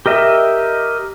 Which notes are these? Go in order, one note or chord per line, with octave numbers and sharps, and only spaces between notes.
G4 A#4 D#5 E5